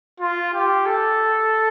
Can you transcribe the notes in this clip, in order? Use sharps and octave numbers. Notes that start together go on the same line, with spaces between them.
F4
G4
A4